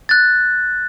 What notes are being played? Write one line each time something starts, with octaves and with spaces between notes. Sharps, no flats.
F#6 A6